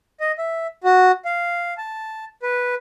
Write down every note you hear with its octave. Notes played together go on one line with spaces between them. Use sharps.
D#5
E5
F#4
F5
A5
B4